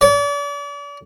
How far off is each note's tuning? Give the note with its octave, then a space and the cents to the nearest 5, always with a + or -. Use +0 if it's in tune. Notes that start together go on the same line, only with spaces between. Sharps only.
D5 -40